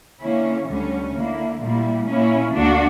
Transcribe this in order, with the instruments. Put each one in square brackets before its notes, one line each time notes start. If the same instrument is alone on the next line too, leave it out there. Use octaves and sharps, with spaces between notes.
[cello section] D3 A#3 C#4 E4
D2 D3 G3 C#4
D3 A#3 E4
A#2 G3 A#3 E4
A#2 A#3 C#4 E4
D2 D3 A#3 D4 F#4